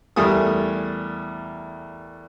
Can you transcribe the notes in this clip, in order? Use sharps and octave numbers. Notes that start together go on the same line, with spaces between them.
E2 G3 A3 A#4 G#5 D#6